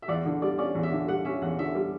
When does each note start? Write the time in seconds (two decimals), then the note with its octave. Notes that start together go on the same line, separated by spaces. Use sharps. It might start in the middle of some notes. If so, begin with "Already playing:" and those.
0.02 E5
0.08 E2 D5
0.25 D3
0.42 G3 D5
0.58 C#4 D5
0.75 E2
0.83 E5
0.92 D3
1.08 G3 F#5
1.25 C#4 E5
1.41 E2 F#5
1.58 D3 E5
1.75 G3